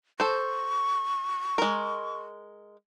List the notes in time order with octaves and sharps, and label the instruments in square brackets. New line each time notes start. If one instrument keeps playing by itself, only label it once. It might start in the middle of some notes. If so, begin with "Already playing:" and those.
[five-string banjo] A4 C5 [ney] C#6
[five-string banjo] G#3 A#4